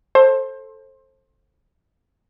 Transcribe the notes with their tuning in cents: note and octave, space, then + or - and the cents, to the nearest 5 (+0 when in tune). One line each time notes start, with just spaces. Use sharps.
A4 +0 C5 +25